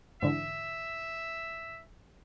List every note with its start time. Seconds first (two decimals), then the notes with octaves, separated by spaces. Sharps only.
0.22 G#2 D3 E3 E5